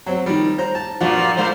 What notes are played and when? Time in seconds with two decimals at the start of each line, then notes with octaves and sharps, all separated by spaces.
0.06 F#3 C4
0.26 D#3 G3
0.58 C5 A#5
0.75 A5
1.00 G2 A#2 F3 F4 F#4
1.37 A#2 G#3 C5